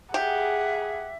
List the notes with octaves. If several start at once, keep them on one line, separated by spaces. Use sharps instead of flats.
G4 G#4 E5 F#5